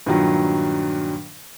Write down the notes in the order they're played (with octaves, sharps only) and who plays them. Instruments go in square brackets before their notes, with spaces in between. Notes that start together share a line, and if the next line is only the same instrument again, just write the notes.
[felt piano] G2 A#2 D#3 F#3